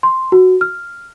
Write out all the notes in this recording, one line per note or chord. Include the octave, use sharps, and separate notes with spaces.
C6
F#4
F6